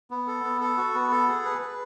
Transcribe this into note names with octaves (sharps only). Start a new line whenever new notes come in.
B3
A4
B3
A4
F#4
B3
A4
G#4
B4
B4